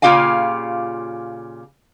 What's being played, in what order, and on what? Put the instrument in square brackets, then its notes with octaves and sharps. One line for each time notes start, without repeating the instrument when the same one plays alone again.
[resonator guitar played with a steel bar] A#2 C#3 F4 G4 F5 G#5